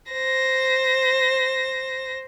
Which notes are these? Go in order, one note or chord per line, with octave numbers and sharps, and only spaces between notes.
C5 A#6